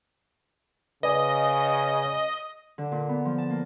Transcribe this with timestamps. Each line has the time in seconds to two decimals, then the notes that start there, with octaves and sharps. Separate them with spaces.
1.03 C#3 B4 D5 D#5 G#5
2.78 D3
2.92 A#2
3.09 B3
3.25 F3
3.38 A5
3.50 A#3